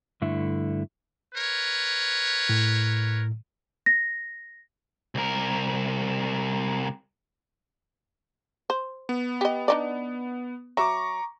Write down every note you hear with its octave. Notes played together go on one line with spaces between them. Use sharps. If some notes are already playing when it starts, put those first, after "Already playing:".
G2 D3 A3 E4
A#4 B4 C#5
A2
A#6
C2 A#4
C5
B3
G4 D#5
D4 D#4 D5
F#3 E5 A#5 C#6 D6